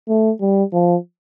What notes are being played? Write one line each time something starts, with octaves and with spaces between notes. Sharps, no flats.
A3
G3
F3